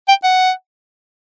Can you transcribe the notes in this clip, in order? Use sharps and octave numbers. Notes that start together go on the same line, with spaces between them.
G5
F#5